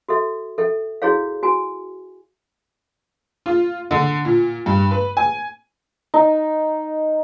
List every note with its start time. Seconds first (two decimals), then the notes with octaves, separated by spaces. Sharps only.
0.09 F#4 A4 E5
0.58 A4 E5 G5
1.02 E4 F#4 G#4 C#5 F5
1.43 F#4 G#5
3.46 F4
3.91 D3
4.25 A#2
4.66 G2
4.91 B4
5.17 G#5
6.14 D#4